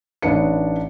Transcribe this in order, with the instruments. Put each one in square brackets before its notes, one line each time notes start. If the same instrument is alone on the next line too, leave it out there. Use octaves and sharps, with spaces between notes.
[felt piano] A1 D4 D#4 B4 C#7